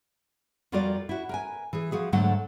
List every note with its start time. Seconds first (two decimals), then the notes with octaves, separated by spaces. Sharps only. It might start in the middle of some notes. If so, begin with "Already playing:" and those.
0.72 F2 G3 F4 F#4 A#4 D5
1.09 E4 F#4
1.29 A#4 B4 G#5
1.73 E3 G#4
1.92 F3 F#4 G#4
2.12 G#2 D3 F#3 A3 F#5